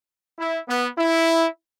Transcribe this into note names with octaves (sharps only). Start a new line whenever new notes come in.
E4
B3
E4